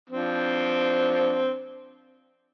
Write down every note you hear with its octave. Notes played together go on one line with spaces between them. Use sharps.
F3 C4 D4